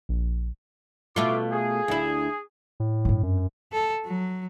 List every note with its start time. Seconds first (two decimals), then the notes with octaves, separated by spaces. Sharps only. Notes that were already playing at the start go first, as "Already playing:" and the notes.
0.09 A#1
1.16 B2 A3 E4 F4 F5 D6
1.51 G#4
1.88 D2 E4
2.80 A2
3.05 G2 C4
3.23 F#2
3.72 A4
4.05 F#3